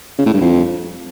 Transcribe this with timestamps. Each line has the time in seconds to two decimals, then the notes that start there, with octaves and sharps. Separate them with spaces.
0.19 C#3
0.26 A2
0.34 G2
0.41 F2